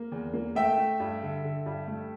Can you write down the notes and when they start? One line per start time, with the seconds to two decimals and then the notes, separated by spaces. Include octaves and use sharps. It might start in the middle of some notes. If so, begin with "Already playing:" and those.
Already playing: A#3
0.12 E2
0.34 A#3
0.55 A3 E5 G5
0.78 A3
1.00 G2
1.22 D3
1.44 D3
1.66 G2
1.87 A3